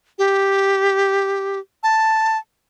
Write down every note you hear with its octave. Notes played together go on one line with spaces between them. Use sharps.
G4
A5